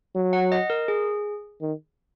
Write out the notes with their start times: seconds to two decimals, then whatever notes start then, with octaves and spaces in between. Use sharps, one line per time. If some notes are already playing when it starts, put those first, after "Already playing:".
0.15 F#3
0.33 F#5
0.52 D#5
0.70 A#4
0.88 G#4
1.61 D#3